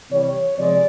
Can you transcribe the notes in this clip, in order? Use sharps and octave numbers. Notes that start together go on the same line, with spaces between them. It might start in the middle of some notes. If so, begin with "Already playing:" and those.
C3 E3 G3 C#5
C3 F3 G#3 D5